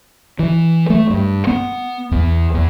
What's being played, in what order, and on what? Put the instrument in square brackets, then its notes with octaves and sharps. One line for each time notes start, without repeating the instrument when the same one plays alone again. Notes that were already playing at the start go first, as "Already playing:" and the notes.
[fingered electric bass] E3
A3
G2
B3
E2
E2